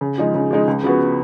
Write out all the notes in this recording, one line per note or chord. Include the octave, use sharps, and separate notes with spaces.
C#3
F3 G#3 D#4
C#3
F3 G#3 D#4
C#2
C#3 F3 B3 F#4